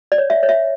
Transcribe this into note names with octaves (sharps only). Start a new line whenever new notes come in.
D5
C#5
E5
C#5
E5